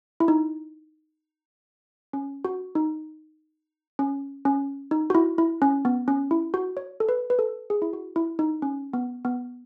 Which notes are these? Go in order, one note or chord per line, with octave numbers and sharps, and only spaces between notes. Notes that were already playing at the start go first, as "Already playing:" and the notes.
E4
D#4
C#4
F#4
D#4
C#4
C#4
D#4
F#4
E4
E4
C#4
B3
C#4
E4
F#4
C#5
A4
B4
B4
A4
G#4
E4
F#4
E4
D#4
C#4
B3
B3